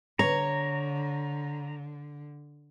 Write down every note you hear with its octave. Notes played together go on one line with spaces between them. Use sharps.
D3 C#5 A#5